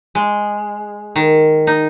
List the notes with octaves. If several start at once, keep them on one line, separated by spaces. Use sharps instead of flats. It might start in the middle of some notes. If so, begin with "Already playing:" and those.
G#3
D#3
D#4